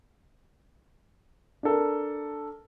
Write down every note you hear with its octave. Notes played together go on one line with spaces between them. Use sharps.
D4 A4 A#4